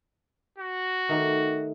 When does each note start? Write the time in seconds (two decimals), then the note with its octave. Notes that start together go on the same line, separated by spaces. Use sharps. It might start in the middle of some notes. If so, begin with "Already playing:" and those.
0.59 F#4
1.09 D#3 A3 D#4 G4